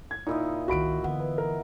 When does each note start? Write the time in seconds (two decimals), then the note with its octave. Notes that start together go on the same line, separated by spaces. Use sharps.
0.11 G#6
0.27 A#2 D#4 E4 D#5
0.68 C2 D#3 F#4 B5 D7
1.04 D3 E3 B3
1.20 B4
1.38 A#4